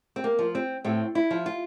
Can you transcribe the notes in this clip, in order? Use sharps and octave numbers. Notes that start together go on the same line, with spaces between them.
C4
A#3
F3
C4
A2 C4
E4
F3
F4